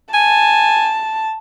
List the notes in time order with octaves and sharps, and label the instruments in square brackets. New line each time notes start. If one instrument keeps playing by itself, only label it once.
[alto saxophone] G#5 [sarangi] A5